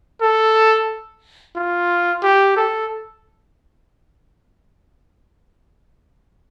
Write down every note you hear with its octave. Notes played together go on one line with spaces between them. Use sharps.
A4
F4
G4
A4